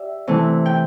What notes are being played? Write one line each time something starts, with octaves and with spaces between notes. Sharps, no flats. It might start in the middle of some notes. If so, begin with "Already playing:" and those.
Already playing: G4 D5 E5
C3 E3 A3
G5